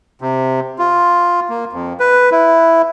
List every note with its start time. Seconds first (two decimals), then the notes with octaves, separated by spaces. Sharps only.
0.21 C3
0.79 F4
1.49 A#3
1.73 F2
2.00 B4
2.32 E4